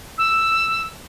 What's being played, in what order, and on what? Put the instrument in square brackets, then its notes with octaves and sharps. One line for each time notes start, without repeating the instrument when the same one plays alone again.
[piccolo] E6